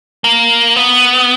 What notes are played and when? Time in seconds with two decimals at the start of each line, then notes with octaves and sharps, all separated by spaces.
0.24 A#3
0.76 B3